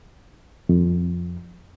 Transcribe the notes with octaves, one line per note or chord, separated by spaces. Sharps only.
F2